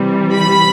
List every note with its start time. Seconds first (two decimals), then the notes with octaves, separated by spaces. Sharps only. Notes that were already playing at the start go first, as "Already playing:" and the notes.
Already playing: C3 E3 G3
0.34 B5